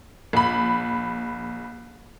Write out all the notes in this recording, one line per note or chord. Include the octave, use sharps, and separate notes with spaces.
A#1 B5